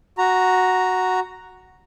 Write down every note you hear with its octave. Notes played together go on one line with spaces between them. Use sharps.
F#4 A#5